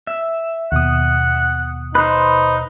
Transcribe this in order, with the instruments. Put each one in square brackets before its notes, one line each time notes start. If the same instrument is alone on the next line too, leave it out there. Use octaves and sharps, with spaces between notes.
[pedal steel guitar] E5
[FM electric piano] D#2 B2 D#6 [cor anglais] F#5
[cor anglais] D#4 [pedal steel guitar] B4 C5